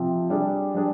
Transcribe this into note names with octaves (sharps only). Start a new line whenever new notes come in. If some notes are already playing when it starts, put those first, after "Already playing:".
Already playing: C3 F3 C4
G3 D4 G#4
G3 D4 G#4